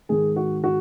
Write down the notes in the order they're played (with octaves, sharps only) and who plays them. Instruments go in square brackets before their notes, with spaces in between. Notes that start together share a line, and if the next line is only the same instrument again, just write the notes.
[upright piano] G#2 D#3 G#3 G#4
F#4
F#4